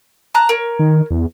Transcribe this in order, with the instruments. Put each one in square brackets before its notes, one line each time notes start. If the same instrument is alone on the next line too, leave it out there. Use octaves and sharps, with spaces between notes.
[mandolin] A5 A#5 F#6
A#4 C#5
[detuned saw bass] D#3
E2